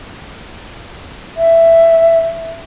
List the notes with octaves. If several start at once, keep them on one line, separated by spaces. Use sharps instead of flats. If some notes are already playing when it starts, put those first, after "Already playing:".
E5